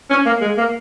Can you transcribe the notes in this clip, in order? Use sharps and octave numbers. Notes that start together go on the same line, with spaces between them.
C#4
A#3
G#3
A#3